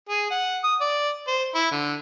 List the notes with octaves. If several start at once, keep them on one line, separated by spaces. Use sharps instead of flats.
G#4
F#5
D#6
D5
C5
E4
D3